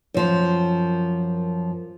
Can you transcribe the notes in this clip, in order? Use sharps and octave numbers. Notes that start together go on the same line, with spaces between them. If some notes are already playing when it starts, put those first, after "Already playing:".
F#2 F3 C5